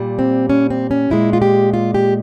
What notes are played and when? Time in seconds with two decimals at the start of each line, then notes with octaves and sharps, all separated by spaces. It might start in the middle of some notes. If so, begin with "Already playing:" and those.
Already playing: A#2 G3
0.19 C4
0.50 C#4
0.70 C4
0.91 C#4
1.10 A#2 G#3 E4
1.33 F4
1.42 G4
1.74 F4
1.94 G4